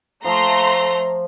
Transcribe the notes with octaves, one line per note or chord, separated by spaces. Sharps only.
F3 A3 A#5 C6